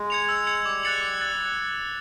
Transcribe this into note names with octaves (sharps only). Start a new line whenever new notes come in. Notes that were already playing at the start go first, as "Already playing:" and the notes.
Already playing: G#3
G#6 C#7 F7
E6
G#6 C#7 F7
G3 D6
F#6 A6 C#7 F#7
D6
F#6 A6 C#7